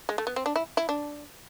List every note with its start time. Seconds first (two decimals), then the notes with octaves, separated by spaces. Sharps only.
0.09 G#3
0.18 A3
0.27 B3
0.36 C4
0.46 D4
0.56 E4
0.77 E4
0.89 D4